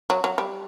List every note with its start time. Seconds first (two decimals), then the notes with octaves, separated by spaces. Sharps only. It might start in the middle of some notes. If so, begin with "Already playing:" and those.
0.10 F#3
0.24 F#3
0.38 G3